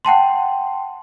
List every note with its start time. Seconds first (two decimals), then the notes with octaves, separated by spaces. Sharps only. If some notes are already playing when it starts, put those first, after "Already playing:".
0.05 F#5 G5 A5 C6